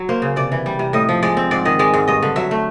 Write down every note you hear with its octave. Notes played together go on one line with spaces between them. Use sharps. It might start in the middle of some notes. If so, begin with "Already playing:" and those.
Already playing: F#3
A#3 C5
C#3
C3 D5
E3
G3
C3
A2 D#5
F3
G#3 D5
C4
G#2 D5
D#3 D#5
G#3 D5
G#2
G2 D#5
D3
F#3 E5
A3